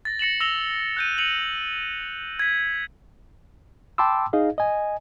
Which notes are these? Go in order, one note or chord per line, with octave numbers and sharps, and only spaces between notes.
A6 A#6
A#6 C#7 E7 F#7
E6 A#6 E7 F7 G7
F#6 G6 D#7
C#7 D#7 F7 F#7
G#6 B6
G5 A5 B5 C6 D6 E6
D#4 G#4 D#5 F5
D#5 G#5